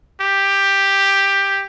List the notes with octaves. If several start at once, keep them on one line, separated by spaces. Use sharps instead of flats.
G4